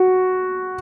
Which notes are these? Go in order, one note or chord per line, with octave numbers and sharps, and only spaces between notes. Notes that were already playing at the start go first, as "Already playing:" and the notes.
Already playing: F#4